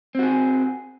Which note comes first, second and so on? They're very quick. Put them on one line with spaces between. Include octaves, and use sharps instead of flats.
C4 F#4 G#4